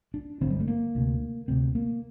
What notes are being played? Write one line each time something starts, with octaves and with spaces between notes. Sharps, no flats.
D4
G1 G2 D3 C4
G3
A3
A#3
D2 C3
D2 C3 C4
A#3